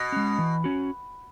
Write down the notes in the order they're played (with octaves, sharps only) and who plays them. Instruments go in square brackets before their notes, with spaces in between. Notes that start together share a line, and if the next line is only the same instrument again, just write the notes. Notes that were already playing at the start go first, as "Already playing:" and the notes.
Already playing: [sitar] B2
[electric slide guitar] G#3 C#4
E3
C#4 F#4